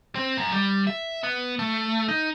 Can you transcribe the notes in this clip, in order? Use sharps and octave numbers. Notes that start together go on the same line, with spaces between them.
C4
F#2
G3
E5
B3
A3
D#4